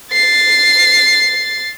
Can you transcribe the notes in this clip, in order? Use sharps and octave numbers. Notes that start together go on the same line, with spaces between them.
A6 C7